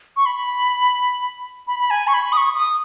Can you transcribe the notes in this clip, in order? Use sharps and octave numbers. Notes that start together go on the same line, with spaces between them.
C#6
B5
B5
B5
G#5
C#6
B5
D#6
C#6
D#6